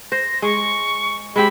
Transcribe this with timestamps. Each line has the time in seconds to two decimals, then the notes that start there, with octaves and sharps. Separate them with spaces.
0.12 C5 A#6
0.42 G#3 C#6
1.36 G#3 C4 G4 B5